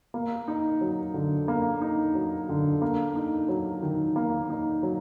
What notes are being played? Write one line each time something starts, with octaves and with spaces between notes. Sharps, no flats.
A#3
D#4
F#3
D3
A#3
D#4
F#3
D3
A#3
D#4
F#3
D#3
A#3
D#4
F#3